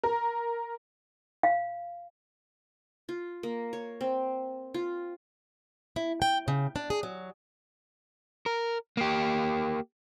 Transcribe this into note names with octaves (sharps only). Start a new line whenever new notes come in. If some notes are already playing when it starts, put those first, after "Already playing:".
A#4
F5
F4
A#3
C#5
C4
F4
E4
G5
C#3
D4
G#4
F#3
A#4
A#3 G4